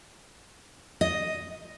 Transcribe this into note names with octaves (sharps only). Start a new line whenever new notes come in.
D#5